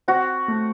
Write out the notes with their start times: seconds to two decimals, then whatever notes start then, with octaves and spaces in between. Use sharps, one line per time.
0.08 C4 F#4
0.48 A3